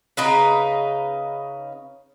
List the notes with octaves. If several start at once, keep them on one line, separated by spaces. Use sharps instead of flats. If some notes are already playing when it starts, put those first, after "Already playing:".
C#3 D#4 B4